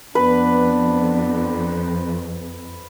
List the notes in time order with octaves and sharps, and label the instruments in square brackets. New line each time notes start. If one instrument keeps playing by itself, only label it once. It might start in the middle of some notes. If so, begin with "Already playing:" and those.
[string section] F2 [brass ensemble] B3 D4 [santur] B4